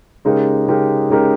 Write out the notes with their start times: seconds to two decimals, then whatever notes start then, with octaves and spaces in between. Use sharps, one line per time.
0.25 C#3 G#3 D#4 G4 A#4
0.68 C#3 G#3 D#4 G4 A#4
1.10 C#3 G#3 D#4 G4 A#4